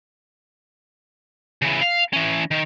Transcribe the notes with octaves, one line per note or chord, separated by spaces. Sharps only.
C#3 E3
F5
E3 C#4
D#3